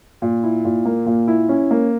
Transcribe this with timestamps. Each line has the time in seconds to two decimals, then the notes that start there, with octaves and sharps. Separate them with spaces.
0.22 A#2
0.43 E4
0.65 A#2
0.85 A#3
1.06 A#2
1.28 E4
1.49 C#4
1.71 A#3